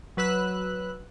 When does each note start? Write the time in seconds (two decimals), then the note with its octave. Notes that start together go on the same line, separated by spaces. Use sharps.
0.17 F#3 B4 E6 F#6